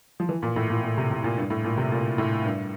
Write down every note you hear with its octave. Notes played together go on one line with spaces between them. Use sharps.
F3
E3
A#2
A2
A#2
A#2
C3
C3
A#2
G2
A2
A#2
C3
A#2
A2
G2